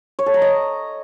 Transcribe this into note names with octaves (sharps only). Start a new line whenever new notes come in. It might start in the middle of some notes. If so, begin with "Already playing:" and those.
C#5
A4
A#5
D#5